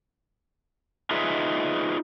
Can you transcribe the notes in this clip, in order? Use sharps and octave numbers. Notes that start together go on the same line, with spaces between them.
D#4 F4 G#4 B4 D#5 E5